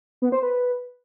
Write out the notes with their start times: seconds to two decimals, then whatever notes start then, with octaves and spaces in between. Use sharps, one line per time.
0.22 B3
0.32 C5
0.43 B4